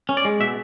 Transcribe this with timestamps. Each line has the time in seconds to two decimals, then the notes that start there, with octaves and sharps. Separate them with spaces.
0.09 C#4
0.17 D5
0.25 G#3
0.40 B2 E5